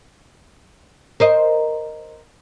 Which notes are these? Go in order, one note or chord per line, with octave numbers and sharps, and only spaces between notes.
A#4 C5 D#5